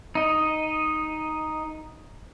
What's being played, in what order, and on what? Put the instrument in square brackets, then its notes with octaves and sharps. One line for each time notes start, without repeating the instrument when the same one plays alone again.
[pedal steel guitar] D#4 D#5